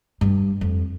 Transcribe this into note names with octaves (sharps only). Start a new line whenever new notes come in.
G2
F2